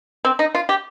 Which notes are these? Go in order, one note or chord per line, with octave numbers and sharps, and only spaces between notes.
C4
D#4
F4
G4